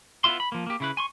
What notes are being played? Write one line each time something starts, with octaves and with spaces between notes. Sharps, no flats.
B3 E4 F4 E5 C6
B5
F3 A#3
A#3 G4
C#3 E4 B4
G#5 C6 C#6